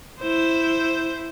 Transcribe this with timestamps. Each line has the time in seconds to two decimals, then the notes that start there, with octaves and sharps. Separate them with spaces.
0.21 E4 C5